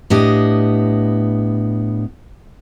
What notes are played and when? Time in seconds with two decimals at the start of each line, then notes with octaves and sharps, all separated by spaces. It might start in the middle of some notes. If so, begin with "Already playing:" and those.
0.10 A2 B3 D4 G4 D#5